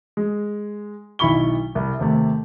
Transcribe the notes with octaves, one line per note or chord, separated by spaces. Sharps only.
G#3
B1 D#3 E4 B5 C#6 G7
C2
D#2 C3 A3